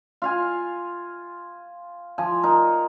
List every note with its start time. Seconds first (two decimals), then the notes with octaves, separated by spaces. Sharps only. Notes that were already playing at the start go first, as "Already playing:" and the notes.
0.22 F4 F5 G#5
2.18 F3 G#5
2.43 D#4 A#4